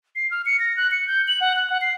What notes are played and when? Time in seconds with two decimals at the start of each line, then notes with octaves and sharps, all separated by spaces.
0.16 C7
0.31 F6
0.46 C#7
0.59 A#6
0.77 F#6
0.92 C#7
1.07 G6
1.28 F#7
1.41 F#5
1.56 F#6
1.70 F#5
1.81 C7